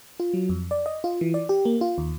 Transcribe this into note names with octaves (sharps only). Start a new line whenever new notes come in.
F4
F#3
F2
D5
D#5
F4
E3
D5
G4
A#3
F4
D#2